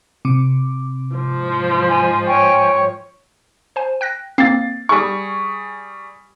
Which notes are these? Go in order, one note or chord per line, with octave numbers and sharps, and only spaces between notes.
C3 D6
G#2 F3
G#5
C#5 G5 G#5
C5 G#5
G5 F#6 A#6
A#3 C4 A6 C7
G3 G#4 C#6